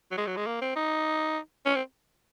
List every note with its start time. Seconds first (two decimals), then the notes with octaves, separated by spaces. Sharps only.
0.12 F#3
0.18 G#3
0.27 F#3
0.37 G#3
0.47 A#3
0.62 C4
0.76 D#4
1.66 C#4
1.75 C4